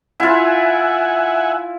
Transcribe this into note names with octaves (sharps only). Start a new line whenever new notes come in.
E4 F4 E5 F#5 G#5